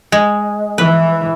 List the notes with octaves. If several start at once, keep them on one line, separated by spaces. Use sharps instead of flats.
G#3
E3 B4